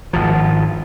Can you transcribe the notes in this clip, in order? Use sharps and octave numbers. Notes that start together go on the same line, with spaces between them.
G#1 F3